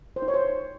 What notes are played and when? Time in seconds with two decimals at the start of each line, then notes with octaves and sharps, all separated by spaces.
0.16 C5
0.22 D#4
0.28 C#5
0.34 C5